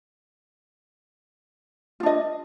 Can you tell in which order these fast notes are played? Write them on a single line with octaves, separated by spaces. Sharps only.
F4 D4 D#5